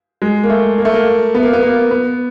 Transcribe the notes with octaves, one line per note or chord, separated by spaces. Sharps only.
G#3
A#3
A3
A#3
A3
A#3
B3
A#3
B3
A#3
B3